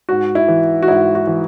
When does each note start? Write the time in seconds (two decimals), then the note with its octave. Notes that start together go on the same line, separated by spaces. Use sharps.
0.09 G#2 F#4
0.35 E4
0.48 E3
0.82 F#4
0.88 G#2 E4
1.15 F#4
1.27 E3